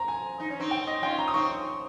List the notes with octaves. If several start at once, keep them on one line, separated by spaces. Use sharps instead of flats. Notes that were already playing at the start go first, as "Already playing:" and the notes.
Already playing: C4 A#5
G#5
D#4
C#4
C4 D#4
G5
D#5
C#4 F4 G5
A#5
D#6
C4 D#4 C#6